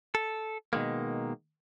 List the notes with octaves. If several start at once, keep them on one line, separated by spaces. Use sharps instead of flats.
A4
B2 D#3 G#3 A#3